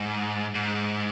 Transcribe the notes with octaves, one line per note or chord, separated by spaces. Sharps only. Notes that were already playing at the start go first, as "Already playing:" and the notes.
Already playing: G#2
G#2